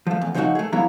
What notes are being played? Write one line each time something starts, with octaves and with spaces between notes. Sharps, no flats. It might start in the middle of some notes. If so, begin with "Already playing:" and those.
F3 A3
E2
C#3 F3 A3 C4 D#4 F#4
A3 G#4
F3 F#3 B3 E4 G#4 A#5